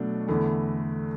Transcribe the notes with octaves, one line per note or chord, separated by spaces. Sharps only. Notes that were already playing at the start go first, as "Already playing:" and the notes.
Already playing: B2 F#3 A3 D4
E2 D3 A3 E4